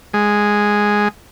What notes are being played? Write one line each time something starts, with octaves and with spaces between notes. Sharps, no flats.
G#3